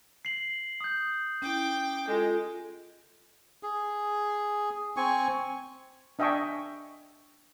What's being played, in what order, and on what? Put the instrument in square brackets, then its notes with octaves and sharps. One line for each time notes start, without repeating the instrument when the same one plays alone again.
[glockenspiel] C7 F#7
D#6 G6
[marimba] C#4 E4 [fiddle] G5 D6
[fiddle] G#3 [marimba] F4 A4
[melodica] G#4
C4 G#5 C#6
[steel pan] D4 D#5 E5 G5 G#5 C#6